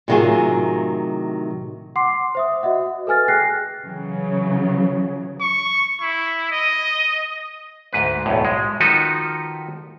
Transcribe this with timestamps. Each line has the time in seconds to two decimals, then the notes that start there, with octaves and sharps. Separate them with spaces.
0.08 A2 C3 D#3 F#3 F4 G#4
1.96 F#5 C6 D6 C7
2.35 C5 E5 D#6
2.63 F#4 D#5 E5 F#5
3.07 A4 B4 G#5 F6 A6
3.28 G#4 G5 F#6 A#6 C7
3.85 C#3 E3 F#3
5.41 C#6
6.02 E4
6.52 D#5
7.93 D2 G#2 B4
8.26 B1 E2 A2
8.45 G#3
8.80 D#3 F3 D#4 F#4 A4 B4